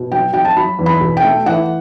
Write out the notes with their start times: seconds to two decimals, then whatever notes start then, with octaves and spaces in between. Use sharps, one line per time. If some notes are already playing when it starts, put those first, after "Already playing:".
Already playing: B2
0.12 F#3 G5
0.34 F#3 G5
0.45 A5
0.57 F#3 B5
0.79 E2
0.86 B5
1.01 B2
1.17 G5
1.24 A3
1.46 E3 F#5